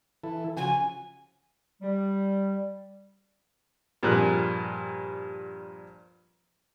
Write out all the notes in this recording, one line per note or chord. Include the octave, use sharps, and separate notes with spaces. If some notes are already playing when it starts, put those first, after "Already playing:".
E3 E4 A4
C#3 F3 F#4 G#5
G3
G2 A#2 F3 G#4 A#4 F#6